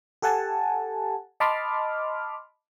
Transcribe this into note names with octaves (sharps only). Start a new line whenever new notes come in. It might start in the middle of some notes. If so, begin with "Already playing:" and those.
G4 A4 F#5 G#5 A5
D#5 A5 B5 C6 D6 F6